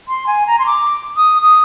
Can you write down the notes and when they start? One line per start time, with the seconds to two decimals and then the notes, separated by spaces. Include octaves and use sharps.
0.08 C6
0.27 G#5
0.47 A#5
0.59 C6
0.66 D6
1.17 D#6
1.42 D#6